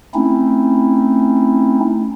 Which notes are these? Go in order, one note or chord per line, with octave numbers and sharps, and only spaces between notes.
A3 C4 C#4 D#4 E4